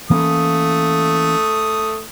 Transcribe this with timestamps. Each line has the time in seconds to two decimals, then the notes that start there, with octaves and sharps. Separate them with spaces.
0.10 E3 A3 A#3 C#4 D#6